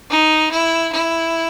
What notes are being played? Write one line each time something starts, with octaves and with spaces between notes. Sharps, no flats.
D#4
E4
E4